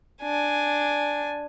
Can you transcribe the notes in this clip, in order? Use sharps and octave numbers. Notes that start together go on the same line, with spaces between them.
D4 G#5